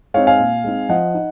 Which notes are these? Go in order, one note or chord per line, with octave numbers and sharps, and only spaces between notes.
G#3 C4 D#4 C#5 F5
F5 G#5
A#2
G#3 C4 D#4
F3 D#5 F#5
D#4